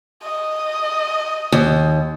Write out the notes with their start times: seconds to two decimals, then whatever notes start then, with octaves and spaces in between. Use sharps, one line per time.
0.23 D#5
1.52 D#2